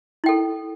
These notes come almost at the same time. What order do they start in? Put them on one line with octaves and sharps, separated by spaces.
E4 G5 A4